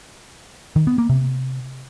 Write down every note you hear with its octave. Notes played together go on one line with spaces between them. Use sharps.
D#3
B3
A#3
C3